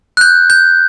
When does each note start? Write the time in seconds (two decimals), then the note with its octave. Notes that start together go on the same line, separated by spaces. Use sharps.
0.17 F#6
0.21 G6
0.50 G6